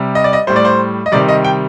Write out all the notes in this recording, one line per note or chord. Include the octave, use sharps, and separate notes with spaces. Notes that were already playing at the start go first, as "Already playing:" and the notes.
Already playing: C3 G3
D#5
D5
D#5
A2 G3 C5
D5
C5
D#5
C3 D#3 G3 D5
D#5
G5